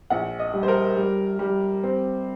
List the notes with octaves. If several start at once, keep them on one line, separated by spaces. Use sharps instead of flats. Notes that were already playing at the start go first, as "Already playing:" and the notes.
A#1 F#5
D#5
G3
C5
A#4
G3
G3
C4